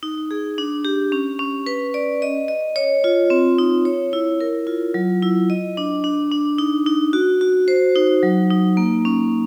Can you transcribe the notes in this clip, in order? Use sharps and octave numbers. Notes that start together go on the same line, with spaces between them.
D#4
G#4
D4
G4
C#4
C#4
B4
D5
D#5
D#5
C#5
F4
C4
D#4
C#5
E4
A#4
F4
F#3
E4
D#5
D4
D4
D4
D#4
D#4
F#4
F#4
C5
D#4
F#3
D#4
A#3
C#4